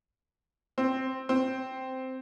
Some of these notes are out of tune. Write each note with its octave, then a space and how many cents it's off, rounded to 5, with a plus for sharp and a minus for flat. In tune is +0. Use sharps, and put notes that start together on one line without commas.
C4 +0
C4 -5